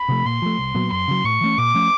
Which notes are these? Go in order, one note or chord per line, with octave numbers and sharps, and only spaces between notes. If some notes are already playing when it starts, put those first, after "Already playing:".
Already playing: B5
C3 F3 A3
A#2 C6
F3 A3
C2
A#2 F#3 B3
F#2 C6
C#3 F#3
A2 C#6
E3 A3 C#4
A#2 D6
F3 A3 C#4